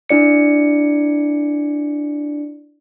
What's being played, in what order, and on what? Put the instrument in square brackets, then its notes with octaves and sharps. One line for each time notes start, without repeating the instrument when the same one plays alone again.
[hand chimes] D4 E4 D5 C#7